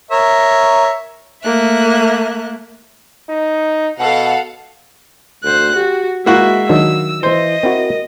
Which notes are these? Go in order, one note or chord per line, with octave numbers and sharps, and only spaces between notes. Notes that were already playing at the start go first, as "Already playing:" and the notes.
A#4 C#5 E5
A3 A#3 E5 F#6
D#4
B2 A4 F5 F#5
D2 C5 F#6
F#4 G4
G#3 A#3 E4 F#4 E5
D#3 F#3 D4 E6
E3 C5 D#5
C4 E4 F#4 A#4